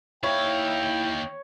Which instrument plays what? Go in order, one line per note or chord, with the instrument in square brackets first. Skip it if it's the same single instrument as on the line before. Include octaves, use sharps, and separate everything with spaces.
[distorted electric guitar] D#2 F5 [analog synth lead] E4 [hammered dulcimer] C#5 [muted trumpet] G5